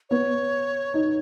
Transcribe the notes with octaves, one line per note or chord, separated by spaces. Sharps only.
B3 C#5
D#4